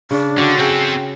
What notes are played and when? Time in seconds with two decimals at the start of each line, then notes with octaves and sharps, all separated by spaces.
0.11 C#3 D4
0.38 D3 F#4 F5 G5
0.58 C#3 C4 G#4 A4 G5